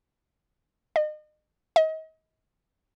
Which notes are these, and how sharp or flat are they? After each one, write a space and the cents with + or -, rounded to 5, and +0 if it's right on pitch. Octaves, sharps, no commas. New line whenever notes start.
D#5 -35
D#5 +35